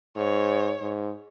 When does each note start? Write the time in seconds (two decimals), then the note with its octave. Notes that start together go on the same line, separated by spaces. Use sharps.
0.16 G#2 C#5
0.81 G#2